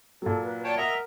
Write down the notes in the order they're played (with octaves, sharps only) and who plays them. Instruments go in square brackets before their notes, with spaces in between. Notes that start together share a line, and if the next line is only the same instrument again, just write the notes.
[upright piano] A#2 F#3 [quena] A4
[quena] B4
[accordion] C#5 G5 A5 [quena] D5
[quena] A#4 [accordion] D#5 E5 A#5 [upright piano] F#5